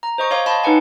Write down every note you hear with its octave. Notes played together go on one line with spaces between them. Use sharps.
A#5
C5 D#5 C#6
C#5 F5 C6 D6
D#5 A5 B5 C6
D#4 B4 F#5 G#5